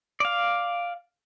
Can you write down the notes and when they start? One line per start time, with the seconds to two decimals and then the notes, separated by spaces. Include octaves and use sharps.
0.20 D5 F5